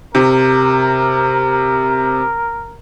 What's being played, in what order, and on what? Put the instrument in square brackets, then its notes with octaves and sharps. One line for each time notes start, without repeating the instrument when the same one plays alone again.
[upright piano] C3 [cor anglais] A#4